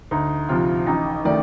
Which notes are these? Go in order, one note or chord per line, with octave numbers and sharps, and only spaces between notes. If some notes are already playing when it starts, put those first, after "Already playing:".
D2 D#4
C3 F3 F4
A1 D#4
D#3 A3 D5